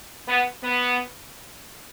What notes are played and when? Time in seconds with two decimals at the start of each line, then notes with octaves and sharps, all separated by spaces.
0.28 B3
0.63 B3